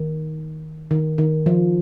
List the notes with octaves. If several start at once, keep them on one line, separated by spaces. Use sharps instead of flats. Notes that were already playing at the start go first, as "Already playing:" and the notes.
Already playing: D#3
D#3
D#3
F3